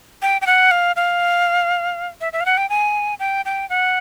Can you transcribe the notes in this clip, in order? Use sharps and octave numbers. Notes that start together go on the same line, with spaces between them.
G5
G5
F#5
F5
F5
E5
E5
F5
F#5
G5
G#5
G5
G5
F#5